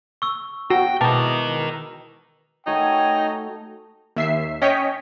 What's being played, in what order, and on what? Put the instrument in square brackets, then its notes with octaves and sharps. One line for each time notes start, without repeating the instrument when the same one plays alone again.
[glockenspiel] C#6 E6
[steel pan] F#4 [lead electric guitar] G5 [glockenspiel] E6 A#6
[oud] B2 E3 G#3 [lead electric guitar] A#4 D#5 [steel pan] A5 [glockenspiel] D6
[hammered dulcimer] A3 F#4 [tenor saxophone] D#4 [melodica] C#5 G#5 [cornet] G5
[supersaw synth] D#2 E5 C7
C#4 C#5 D#5 G5 B6